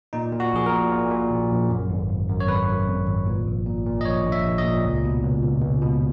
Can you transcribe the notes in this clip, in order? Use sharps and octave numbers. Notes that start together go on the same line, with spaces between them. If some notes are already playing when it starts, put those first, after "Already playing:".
A#2 D#4
A#2
F#4
A#1 G#4
A#4
A#2
A#2
A#2
A#1
A#1
F#2
G#1
G#1
F#2
C#5
G#1 B4
F#2
G#1
G#1
A#2
A#1
A#2
A#2
D#5
A#1 C#5
A#1
E5
A#1
D#5
A#2
C#2
B2
C#2
C#2
C#2
B2